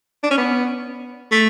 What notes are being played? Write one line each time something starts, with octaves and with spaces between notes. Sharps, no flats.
D4
C#4
B3
A3